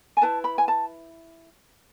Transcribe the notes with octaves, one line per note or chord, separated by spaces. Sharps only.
G#5
E4 B4 A5
B5
G#5
A5